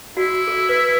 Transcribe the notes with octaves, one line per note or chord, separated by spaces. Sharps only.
E4 F#4
A4
B4